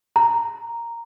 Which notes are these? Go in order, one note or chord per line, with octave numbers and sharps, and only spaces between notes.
A#5